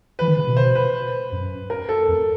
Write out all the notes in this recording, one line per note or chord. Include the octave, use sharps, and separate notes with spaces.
E3 B4
D#3
C#3
B2
C5
B4
F#2
A#4
A4
F2